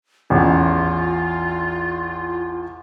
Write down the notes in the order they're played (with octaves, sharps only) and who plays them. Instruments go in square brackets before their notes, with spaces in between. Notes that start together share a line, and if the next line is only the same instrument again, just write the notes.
[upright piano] A1 E2 [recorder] F4